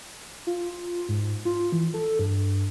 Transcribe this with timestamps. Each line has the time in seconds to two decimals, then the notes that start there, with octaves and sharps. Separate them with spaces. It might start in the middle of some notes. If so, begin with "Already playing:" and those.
0.47 F4
1.09 G#2
1.45 F4
1.72 E3
1.94 A4
2.19 G2